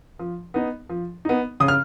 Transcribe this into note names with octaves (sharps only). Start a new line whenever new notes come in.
F3
B3 D#4
F3
B3 D#4
C#3 D#6
F6